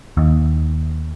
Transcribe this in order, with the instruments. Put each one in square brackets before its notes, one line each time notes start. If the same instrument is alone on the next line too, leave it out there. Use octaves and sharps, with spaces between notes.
[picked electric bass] D#2